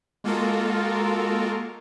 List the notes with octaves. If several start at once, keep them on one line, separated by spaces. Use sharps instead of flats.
G#3 A#3 F4 F#4 A4 A#4